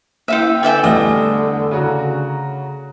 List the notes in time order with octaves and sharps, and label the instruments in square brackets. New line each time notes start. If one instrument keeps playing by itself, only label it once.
[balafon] A#3 E4 [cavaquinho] E5 F5 G5
[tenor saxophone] D3 [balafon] B4 G#5 [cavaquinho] D5 E5 G5
[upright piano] E2 G3 G7 [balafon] A3 [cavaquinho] D#5
[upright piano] C#3 F#4 A#5